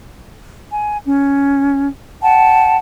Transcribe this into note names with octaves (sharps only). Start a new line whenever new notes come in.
G#5
C#4
F#5 G5 A5